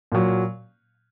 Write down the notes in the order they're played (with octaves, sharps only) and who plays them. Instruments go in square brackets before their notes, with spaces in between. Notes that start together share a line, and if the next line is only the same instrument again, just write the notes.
[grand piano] A#2 F#3